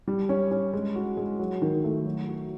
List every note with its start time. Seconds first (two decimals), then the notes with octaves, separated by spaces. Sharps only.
0.08 G3
0.29 C#4
0.51 C#4
0.74 G#3
0.96 F#4
1.17 G#3
1.39 F#3
1.62 D#3
1.84 A3
2.05 F#3
2.28 F#4